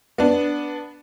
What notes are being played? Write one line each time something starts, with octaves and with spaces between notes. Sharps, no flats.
B3 D4